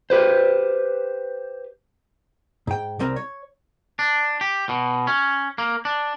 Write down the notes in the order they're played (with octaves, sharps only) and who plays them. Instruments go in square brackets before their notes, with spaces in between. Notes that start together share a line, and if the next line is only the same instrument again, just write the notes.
[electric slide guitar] G4 B4 C5
[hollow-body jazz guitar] G#2 G5
C2 G3 C4 A#4
C#5
[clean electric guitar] D4
G4
B2
C#4
A#3
D4